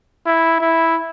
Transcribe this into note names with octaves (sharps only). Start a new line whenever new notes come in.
E4
E4